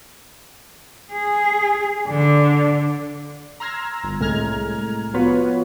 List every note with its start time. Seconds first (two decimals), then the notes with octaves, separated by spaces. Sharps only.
1.13 G#4
2.08 D3
3.60 A#5 C6 E6 F6 G#6 A#6
4.04 G1
4.20 C2 A2 G#3 A#5 F6 G#6
5.14 F3 B3 F4 F#4 B4 C#5